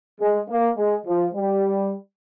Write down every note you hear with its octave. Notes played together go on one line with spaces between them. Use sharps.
G#3
A#3
G#3
F3
G3